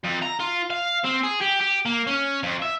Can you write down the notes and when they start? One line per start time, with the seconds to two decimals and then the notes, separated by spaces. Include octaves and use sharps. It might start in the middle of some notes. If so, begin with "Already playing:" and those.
0.04 F2
0.23 A#5
0.40 F4
0.70 F5
1.04 C4
1.23 G#4
1.41 G4
1.61 G4
1.86 A#3
2.07 C#4
2.43 F2
2.62 E5